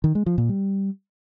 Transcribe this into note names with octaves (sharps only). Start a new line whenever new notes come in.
D#3
G#3
F3
A#2
G3